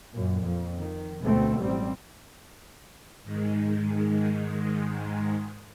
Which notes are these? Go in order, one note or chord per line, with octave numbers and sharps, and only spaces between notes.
F#2 A#2
F2
D#3
D2 B2 A3 C4
A1 G3 C4
G#2 D#3 G#3